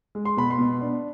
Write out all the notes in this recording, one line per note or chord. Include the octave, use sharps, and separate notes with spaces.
G#3
C6
B2 B5
C6
B2
D4